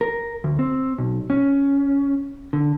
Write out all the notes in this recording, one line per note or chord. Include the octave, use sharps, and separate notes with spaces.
A#4
D2
C4
B1
C#4
D3